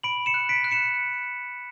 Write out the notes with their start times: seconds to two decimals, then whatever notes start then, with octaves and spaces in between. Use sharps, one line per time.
0.03 B5 D7 F#7
0.26 C#7 E7
0.34 F#6
0.49 B6 D7
0.64 F#6
0.71 C#7 E7